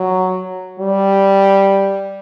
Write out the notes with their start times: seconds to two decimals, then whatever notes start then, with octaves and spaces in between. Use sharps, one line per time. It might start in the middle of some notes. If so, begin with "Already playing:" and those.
Already playing: F#3
0.80 G3